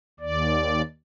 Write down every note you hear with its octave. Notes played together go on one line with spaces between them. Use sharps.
D#2 D5